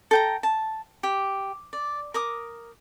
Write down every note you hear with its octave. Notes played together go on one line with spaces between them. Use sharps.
A4 G5 A#5
A5
G4
D5
A#4 D6 D#6